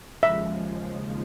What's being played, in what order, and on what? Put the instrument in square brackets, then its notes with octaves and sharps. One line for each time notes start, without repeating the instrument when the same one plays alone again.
[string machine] D#2 C#3 F3 G#3 [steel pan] E5